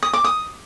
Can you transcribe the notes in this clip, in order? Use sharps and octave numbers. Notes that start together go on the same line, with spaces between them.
D#6
D6
D#6